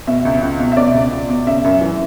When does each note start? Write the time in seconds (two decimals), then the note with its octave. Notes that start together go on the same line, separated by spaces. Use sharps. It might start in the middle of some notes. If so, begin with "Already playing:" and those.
0.07 B2 E5
0.25 C#2
0.42 C#2
0.59 B2
0.72 E5
0.77 B2 D5
0.94 C#2
1.12 C#2
1.29 B2
1.46 C#3 E5
1.64 F#2
1.81 E3